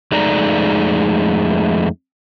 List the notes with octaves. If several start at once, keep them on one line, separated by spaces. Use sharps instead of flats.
F2 G#3 A3 D#4 D5 A#5